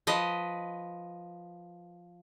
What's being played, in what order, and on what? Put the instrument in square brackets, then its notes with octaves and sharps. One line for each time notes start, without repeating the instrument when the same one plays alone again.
[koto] F3 B4 D#5